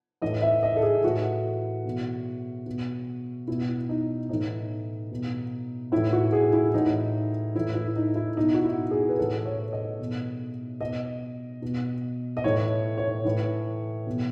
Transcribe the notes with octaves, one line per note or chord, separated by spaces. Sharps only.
A2 E3 D#5
E5
D#5
A4
G#4
A2 E3 F#4
B2
B2
B2 E4
D#4
A2 E3 D#4
B2
A2 E3 E4
F#4
G#4
E4
A2 E3 D#4
A2 E3 E4
E4
D#4
E4
B2 D#4
F#4
E4
G#4
B4
A2 E3 A4
C#5
D#5
B2
B2 D#5
B2
D#5
A2 E3 C#5
C#5
A2 E3
B2